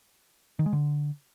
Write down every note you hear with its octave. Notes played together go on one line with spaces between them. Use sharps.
D#3
G#3
D3